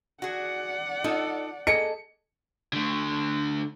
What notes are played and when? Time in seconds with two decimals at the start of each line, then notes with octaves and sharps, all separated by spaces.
0.22 F#4 G#4 D5 F#5
1.04 D#4 F4 A4
1.67 A#3 G#4 A4 D#5 C#7
2.73 D3 A3